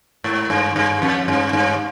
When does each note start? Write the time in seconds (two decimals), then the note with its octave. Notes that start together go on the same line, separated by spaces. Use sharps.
0.24 G#2
0.50 G2
0.76 G2
1.02 F2
1.28 G2
1.53 G2